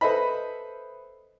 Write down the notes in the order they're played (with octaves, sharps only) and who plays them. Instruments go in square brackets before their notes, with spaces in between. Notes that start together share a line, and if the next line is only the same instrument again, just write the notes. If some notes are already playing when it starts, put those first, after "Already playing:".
[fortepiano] A4 B4 C5 D#5 E5 B5